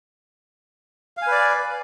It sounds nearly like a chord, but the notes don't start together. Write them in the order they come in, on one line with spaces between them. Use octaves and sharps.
F5 G#5 B4 D5